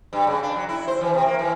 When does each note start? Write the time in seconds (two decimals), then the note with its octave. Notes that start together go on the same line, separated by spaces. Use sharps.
0.13 G2
0.27 C#3
0.43 D4
0.56 F#3
0.69 E4
0.88 C5
1.01 E3
1.14 C3
1.26 A#3
1.39 E3